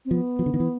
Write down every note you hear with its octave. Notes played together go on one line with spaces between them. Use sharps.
C4
F3 B3
F3
D3
D#3
E3